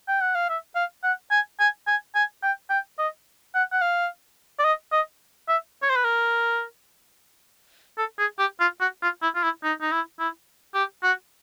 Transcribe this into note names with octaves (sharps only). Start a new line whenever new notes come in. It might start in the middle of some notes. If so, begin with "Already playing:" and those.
G5
F#5
F5
E5
F5
F#5
G#5
G#5
G#5
G#5
G5
G5
D#5
F#5
F#5
F5
D5
D#5
D#5
E5
C#5
C5
B4
A#4
A4
G#4
G4
F4
F#4
F4
E4
F4
E4
D#4
D#4
E4
E4
G4
F#4